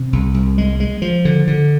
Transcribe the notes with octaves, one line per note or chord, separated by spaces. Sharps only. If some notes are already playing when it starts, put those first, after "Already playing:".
Already playing: C3
C2
C2
G#3
G#3
F3
D3
D3